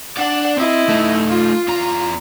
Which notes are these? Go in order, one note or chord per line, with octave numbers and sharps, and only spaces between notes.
D4 D5 F#5
C4 E4 D#5
A3 D#4
F4
E2 A#5